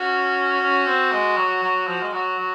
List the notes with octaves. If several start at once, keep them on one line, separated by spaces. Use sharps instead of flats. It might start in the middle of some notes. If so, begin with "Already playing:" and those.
Already playing: C#4 F#4
C#4
C4
G#3
F#3
F#3
F3
G#3
F#3 F#4
F#3